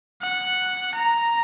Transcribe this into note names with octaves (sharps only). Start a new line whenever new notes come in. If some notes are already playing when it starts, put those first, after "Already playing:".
F#5
A#5